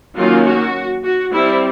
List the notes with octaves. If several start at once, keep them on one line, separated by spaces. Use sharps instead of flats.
D#3 F#3 A#3 C#4 F4
F#4
F#4
G3 C4 E4